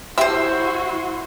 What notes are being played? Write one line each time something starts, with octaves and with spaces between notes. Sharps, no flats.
E4 F#4 G4 C5 E5 C6 E6